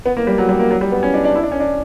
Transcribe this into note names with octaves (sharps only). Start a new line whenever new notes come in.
B3
A#3
G3
F#3
G3
A#3
F#3
G3
B3
C#4
D4
D4
E4
D4
C#4
D4